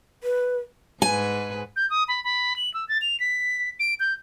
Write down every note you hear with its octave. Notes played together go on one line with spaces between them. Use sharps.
B4
G#2 B4 G#5
G6
D#6
B5
B5
F#7
E6
A6
F7
B6
D7
G6